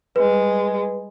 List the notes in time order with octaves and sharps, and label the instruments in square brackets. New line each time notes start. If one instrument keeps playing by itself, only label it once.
[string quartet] G3 G#3 [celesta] B4